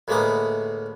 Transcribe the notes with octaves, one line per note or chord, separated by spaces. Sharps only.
D2 A2 G#3 A#3 B3 D#6